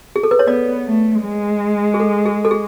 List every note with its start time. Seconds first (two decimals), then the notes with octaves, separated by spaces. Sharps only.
0.16 G#4
0.23 A4
0.31 B4
0.39 C#5
0.46 B3 D5
0.85 A3
1.23 G#3
1.94 G#4
2.00 A4
2.26 G#4
2.45 A4
2.51 G#4